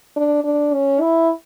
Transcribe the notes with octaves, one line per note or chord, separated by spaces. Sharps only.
D4
D4
C#4
E4